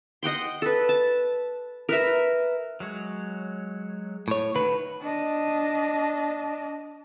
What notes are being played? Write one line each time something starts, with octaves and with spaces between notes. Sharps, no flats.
D#5 F#5 G5 C6
A4 B4
A5
A#4 B4 E5
F#3 G#3 C#5
A2 C#5
D#3 A3 F#4 B4
D4 D#5